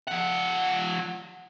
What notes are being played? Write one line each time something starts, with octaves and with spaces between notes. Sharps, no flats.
F3 F#5